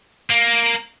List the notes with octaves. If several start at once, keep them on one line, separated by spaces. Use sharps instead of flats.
A#3